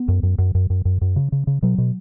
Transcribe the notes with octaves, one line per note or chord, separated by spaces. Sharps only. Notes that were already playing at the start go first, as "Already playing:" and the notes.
Already playing: B3
F#2
F#2
F#2
F#2
F#2
F#2
F#2
C#3
C#3
C#3
B2 F#3
B2